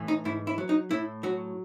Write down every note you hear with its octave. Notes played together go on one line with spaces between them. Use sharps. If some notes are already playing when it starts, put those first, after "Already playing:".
Already playing: A2 E3
D#4
G#2 E4
E4
F#3
D#4
A2 E4
F#3 F#4